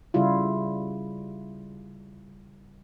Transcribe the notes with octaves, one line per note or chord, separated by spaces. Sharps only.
C#3 G3 E4 F4